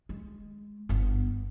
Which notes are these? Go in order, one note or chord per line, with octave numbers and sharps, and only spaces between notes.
G#3
G1 B3